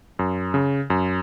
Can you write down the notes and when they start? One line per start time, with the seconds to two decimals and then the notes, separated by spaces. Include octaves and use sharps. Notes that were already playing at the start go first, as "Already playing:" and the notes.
0.19 F#2
0.54 C#3
0.90 F#2